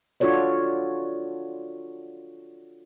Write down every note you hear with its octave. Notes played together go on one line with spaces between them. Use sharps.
D4 F4 F#4 A4 C#5 D5